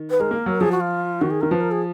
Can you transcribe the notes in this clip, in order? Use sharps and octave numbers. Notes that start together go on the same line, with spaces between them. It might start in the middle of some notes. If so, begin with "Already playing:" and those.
Already playing: D#3
B4
G#3 A#4
A#3
F#3
F3 G#4
F#4
F4
D#3 F#4
G#4
D#3 A#4
F3 B4
A#4
G#4